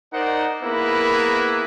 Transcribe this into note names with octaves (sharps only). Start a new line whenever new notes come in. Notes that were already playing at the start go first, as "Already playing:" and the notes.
D#4 A#4 C5 D5 F#5
A#3 B3 E4 G#4 A#4 B4